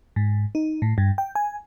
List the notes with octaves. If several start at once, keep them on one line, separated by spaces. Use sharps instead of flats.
G#2
D#4
A2
G2
G5
G#5